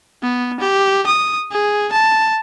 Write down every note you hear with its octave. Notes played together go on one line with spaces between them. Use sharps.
B3
G4
D#6
G#4
A5